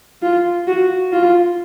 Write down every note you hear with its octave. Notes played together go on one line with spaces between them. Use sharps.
F4
F#4
F4